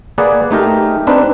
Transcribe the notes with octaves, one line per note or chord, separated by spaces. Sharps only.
A#3 G#4 B4 D5 F#5
A3 D#4 G4 A#4
C4 D4 D#4 B4